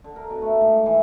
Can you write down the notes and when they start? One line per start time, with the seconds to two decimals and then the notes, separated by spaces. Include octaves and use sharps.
0.04 D3
0.16 A#4
0.30 B2
0.42 A3
0.61 G#2
0.86 E3